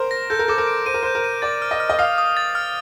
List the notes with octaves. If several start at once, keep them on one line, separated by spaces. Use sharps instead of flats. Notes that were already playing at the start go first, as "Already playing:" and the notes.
Already playing: A#4 C5
A#6
A4 G6
A#4
A4 D6
A#4
D7
C5 D#7
A#4
C5 G6
A#4
D#7
D5 A6
F6
D#5
F6
D#5
F5 D#6
D#6
A6
F6